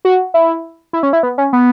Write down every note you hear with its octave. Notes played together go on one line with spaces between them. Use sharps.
F#4
E4
E4
C#4
E4
B3
C#4
B3